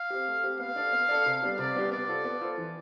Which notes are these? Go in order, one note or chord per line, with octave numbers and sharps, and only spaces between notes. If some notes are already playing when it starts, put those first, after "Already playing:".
Already playing: F5
C4 G4
A3
C4 G4
B3 F5
D4 A4 D5
B3
D4 A4 D5
C3
G3 B3 D4 G4
C3 D5
G3 B3 D4 G4
B3 D5
F4 A4 C5
B3
F4 A4 C5
E3